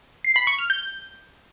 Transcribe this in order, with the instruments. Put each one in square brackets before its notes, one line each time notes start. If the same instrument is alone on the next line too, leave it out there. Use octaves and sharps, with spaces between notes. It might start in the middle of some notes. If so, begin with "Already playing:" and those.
[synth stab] C7
B5
C#6
F6
G6